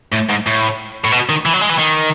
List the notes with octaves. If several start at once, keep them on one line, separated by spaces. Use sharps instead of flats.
A2
G#2
A2
A2
B2
D#3
E3
F#3
G#3
E3
D#3